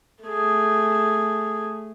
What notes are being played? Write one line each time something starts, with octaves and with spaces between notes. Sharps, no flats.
A3 G#4